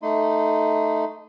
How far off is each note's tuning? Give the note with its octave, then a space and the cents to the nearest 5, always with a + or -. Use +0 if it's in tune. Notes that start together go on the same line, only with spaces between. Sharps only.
A3 +0 D#4 +0 C6 -35